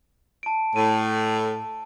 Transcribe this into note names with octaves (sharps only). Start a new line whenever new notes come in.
A5 D7
A2 D#7